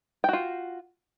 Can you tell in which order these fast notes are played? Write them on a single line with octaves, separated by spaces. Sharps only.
G5 F#4 F4